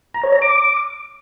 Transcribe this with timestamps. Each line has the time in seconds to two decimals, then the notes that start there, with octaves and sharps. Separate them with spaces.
0.14 A#5
0.24 C#5
0.33 A#5
0.42 D6